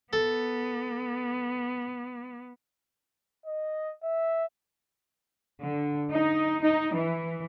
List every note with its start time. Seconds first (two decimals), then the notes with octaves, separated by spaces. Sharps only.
0.13 B3 A4
3.46 D#5
4.03 E5
5.62 D3
6.12 D#4
6.64 D#4
6.95 E3